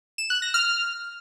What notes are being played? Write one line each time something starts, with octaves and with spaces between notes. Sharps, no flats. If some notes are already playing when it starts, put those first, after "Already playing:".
E7
F#6
A#6
F6